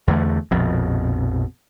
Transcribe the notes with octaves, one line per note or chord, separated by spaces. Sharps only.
E2 D3 A3
A#1 F2 B2